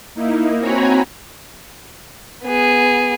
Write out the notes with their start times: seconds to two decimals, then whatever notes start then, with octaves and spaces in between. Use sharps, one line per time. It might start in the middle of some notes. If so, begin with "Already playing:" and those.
0.15 A#3 D#4 E4
0.60 C4 F#4 C#5 G#5 A#5 B5
2.44 B3 G#4